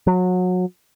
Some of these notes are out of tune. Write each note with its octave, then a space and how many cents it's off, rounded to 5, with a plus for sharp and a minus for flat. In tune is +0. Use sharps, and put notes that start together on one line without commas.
F#3 -25